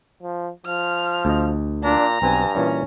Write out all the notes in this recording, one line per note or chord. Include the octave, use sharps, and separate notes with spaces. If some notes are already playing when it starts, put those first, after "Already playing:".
F3
F3 F6
D2 D#5
A#2 D4 A#5
B1 G2 C4 B4 G#5
A#2 E3 G3 C#4